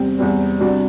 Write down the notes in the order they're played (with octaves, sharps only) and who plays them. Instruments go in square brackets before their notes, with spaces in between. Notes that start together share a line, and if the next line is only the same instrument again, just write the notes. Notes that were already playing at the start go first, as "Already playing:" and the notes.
Already playing: [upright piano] E2 C3 G3 C4
E2 C3 G3 C4
C3 G3 D4 F#4